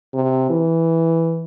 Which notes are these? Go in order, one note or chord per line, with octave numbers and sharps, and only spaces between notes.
C3
E3